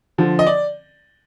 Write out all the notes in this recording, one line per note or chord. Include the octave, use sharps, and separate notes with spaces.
D3 F3
D#5
D5